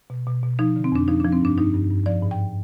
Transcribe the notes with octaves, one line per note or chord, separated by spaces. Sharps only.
B2
B2
B2
F3 D#4
D3
C4
F2 D4
F3 D#4
F3 D4
C4
G2 D4
G2 D#4
G2
G2
F3 D5
G#2
G5